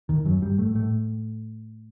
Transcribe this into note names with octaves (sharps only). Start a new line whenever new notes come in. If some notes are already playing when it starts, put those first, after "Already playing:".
D#2 D#3
F#2 F#3
G2 G3
A2 A3
A2 A3